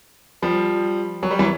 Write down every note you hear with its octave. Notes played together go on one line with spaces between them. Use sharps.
F3 G3
F#3
G3
E3 F#3